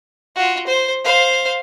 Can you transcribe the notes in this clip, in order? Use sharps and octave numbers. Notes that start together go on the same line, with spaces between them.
F4 F#4
C5
C5 F5